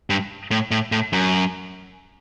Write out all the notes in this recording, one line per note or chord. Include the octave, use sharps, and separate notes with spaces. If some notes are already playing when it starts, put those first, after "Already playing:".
G2
A2
A2
A2
F#2